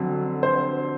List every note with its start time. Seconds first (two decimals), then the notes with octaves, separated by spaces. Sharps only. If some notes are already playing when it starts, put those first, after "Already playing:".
Already playing: F2 D3 F#3
0.43 C5